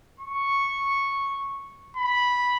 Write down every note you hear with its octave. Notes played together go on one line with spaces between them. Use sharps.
C#6
B5